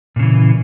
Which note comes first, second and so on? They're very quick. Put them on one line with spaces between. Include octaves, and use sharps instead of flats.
A#2 C#3 E3